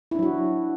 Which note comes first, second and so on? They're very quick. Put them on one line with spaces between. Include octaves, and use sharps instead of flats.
E4 D4 F#3 F#4